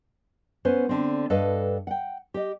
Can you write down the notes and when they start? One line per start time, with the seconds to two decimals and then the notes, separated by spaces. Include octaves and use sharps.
0.65 B3 C#4 B4 C5
0.89 D3 C4
1.30 G2 A4 B4 D#5 F5
1.87 F#5 G5
2.34 G4 D#5